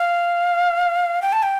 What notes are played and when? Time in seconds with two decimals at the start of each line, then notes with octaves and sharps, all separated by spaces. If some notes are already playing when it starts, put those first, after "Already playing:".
Already playing: F5
1.22 G5
1.33 A5
1.43 G5